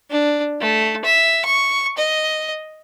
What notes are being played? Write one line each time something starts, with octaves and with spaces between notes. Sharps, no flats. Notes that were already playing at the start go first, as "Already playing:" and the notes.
D4
A3
E5
C#6
D#5